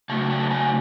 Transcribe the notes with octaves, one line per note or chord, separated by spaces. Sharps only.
C#3 F#3 A3 A5
A5
G#5